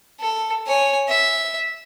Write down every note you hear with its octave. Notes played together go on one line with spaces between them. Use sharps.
A4
C#5 G#5
E5